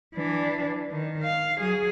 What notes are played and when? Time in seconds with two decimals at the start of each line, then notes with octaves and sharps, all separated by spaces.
0.15 E3 D4
0.92 D#3
1.23 F5
1.58 F#3 G#4